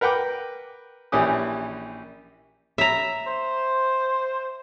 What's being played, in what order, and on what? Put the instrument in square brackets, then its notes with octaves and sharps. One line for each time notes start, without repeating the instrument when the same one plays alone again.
[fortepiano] A#4 B4 F#5 G5 D6
A#1 E3 C#4 G4 D#6
[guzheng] E5 A#5
[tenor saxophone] C5